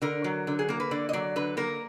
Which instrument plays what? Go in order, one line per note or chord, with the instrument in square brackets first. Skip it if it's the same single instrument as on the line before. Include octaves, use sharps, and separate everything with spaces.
[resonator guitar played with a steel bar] D3 A#4
F#3
D3
G#4
A#3 A#4
B4
D3 D5
D#5
F#3 D5
D3 B4
A#3 A#4